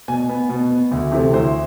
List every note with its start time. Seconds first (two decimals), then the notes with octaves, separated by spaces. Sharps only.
0.08 B2 G#5
0.29 B3
0.49 B2
0.70 B3
0.92 D2
1.12 C3 E3 A3 C4
1.33 D2 C5